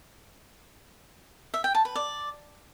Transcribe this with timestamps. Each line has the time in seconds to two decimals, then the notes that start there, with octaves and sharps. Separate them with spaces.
1.54 E5
1.64 G5
1.75 A5
1.85 B4
1.96 D5